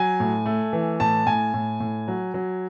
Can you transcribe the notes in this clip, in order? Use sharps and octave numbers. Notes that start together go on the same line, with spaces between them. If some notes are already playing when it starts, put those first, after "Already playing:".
Already playing: F#3 G#5
A2
A3
E3
A2 A5
A2 G#5
A2
A2
F#3
F#3